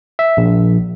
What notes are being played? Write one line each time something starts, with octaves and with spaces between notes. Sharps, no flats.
E5
A#1